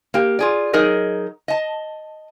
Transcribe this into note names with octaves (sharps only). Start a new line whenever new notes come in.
A#3 G4
F4 G#4 D5
F#3 D#4 G#4 A#4 D#5
D#5 A5